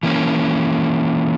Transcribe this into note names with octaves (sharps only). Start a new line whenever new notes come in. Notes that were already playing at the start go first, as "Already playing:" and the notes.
E3 A#3 C#4